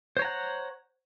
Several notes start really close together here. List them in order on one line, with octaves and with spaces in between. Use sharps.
C5 C#5 A#5 F#5